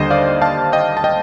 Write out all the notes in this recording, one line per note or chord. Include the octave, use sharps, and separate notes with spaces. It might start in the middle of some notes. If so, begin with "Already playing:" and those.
Already playing: D#2 D3 G3 C5 D#5
D5 F5
F5 A5
D#5 G5
A5
D#5 G5